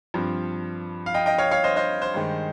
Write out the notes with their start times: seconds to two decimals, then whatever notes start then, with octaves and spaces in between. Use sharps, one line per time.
0.14 G2 F3 C4
1.06 F5
1.14 D#5 G5
1.26 D#5 G5
1.38 C#5 F5
1.51 C#5 F5
1.64 C5 D#5
1.76 C5 D#5
2.02 C5
2.14 G2 D#3 G#3 D#4